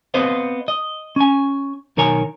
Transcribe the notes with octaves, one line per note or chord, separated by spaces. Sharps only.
B3 C4 B4 C5 D#5 F5
D#5
C#4 G#5
B1 D#3 A#4 C#5 G#5 A#5